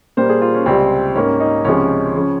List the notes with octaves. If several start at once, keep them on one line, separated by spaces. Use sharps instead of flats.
A#2 G3 A#3 C5
G#4
F4
C#4
C#2 C3 G3 C4
G#2 G3 A#3 C#4
D#4
C#2 C3 F3 G#3 C#4
C#3 F3